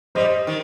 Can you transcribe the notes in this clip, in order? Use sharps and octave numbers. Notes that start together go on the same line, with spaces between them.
G3 C5 D#5
D#3